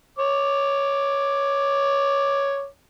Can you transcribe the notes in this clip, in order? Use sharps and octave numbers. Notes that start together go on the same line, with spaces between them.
C#5 D6